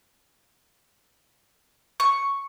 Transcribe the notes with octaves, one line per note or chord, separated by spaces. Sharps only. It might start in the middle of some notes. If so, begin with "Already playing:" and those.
C#6